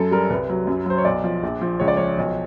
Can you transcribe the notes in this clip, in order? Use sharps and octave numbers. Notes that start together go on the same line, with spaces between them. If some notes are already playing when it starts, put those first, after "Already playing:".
Already playing: F#2 A4
G3 A#4
C2 B4
F#3
F#2
F#3 C5
C#5
B1 D5
F3
A#1
F3
C#2 C#5
D5
F3 C#5
B1